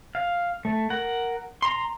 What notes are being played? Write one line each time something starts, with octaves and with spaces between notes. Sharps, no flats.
F5
A3
A#4 F#5
A#5 C6